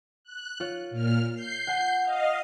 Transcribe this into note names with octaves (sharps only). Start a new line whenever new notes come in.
F#6
F4 C#5
A#2 F6
G6 C7
F#5 G#5 D#7
D#5 F5